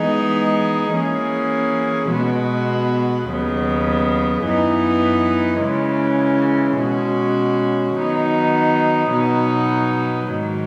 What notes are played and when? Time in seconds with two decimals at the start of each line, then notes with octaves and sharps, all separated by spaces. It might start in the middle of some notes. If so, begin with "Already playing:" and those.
Already playing: E3 G#3 B3 D#4 G#4
0.93 E3 A#3 C#4 G#4
2.10 B2 G#3 B3 F#4
3.27 D#2 C#3 F#3 B3
4.44 F#2 E3 B3 D#4
5.61 C#3 E3 G#3 C#4
6.78 B2 G#3 C#4 F#4
7.95 D#3 F#3 B3 D#4
9.11 B2 F#3 B3 D#4
10.28 G#2 D#3 F#3